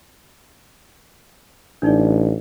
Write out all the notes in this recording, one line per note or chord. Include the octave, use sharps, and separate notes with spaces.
A1 D4 D#4 D5